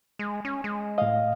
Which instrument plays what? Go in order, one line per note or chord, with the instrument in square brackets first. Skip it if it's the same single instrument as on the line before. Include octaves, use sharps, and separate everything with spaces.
[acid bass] G#3
C#4
G#3
[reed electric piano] A2 D#5 [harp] F5